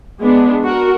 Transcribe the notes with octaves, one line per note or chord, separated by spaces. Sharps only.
G#3 B3 D4
F#4 A#4